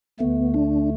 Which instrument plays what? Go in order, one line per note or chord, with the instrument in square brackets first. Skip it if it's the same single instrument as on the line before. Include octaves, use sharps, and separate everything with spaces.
[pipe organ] D2 D3 A3 [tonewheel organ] B3
[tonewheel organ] D4